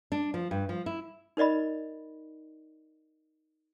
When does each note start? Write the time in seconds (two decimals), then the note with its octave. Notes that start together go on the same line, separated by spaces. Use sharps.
0.12 D4
0.34 F3
0.51 G2
0.69 F3
0.86 E4
1.37 D#4 A#4 D5 D#5 B5